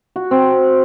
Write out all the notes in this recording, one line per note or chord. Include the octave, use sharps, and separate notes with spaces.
F#4
C4